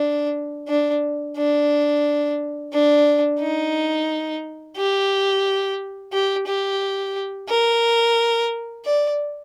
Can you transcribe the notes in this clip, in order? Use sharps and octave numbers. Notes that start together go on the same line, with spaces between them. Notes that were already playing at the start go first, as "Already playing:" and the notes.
Already playing: D4
D4
D4
D4
D#4
G4
G4
G4
A#4
D5